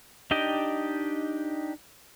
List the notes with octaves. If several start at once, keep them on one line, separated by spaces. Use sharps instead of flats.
D4 D#4 G4 D#5 G5